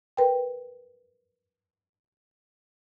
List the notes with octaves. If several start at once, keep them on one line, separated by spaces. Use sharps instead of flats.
A#4 B4 G5